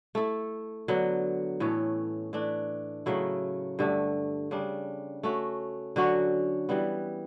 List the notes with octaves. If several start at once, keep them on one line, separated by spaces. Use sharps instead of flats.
A3 E4 A4
D3 F#3 B3
A2 E3 A3 C#4
E3 A3 D4
C#3 F#3 A3 E4
G2 D3 A3
C#3 G3 D4
A3 C#4 F#4
D3 F#3 C#4 F#4
E3 G3 B3